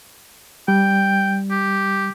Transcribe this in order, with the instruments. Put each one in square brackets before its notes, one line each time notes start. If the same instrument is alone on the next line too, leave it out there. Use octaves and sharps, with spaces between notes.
[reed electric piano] G3 [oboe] G5
[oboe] G4